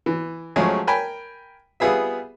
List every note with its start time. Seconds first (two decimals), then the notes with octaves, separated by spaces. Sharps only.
0.06 E3
0.56 F3 F#3 G#3 A3 C#4 G#4
0.87 A#4 G5 G#5 B5
1.80 G3 B3 F4 G#4 B4 E5